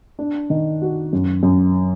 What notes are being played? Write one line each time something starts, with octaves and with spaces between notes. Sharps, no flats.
D4
D#3
F#4
F#2
F#2